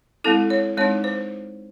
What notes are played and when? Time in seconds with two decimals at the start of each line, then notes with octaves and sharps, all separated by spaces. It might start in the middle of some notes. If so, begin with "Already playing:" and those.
0.24 G#3 C4 E4 A4
0.50 C#5
0.77 G#3 C4 D#4 C#5
1.04 C5